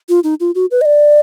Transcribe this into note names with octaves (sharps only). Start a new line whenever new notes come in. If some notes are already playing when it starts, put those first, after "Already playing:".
F4
D#4
F4
F#4
B4
D#5
D5